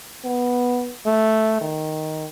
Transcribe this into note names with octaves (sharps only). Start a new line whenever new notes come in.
B3
A3
D#3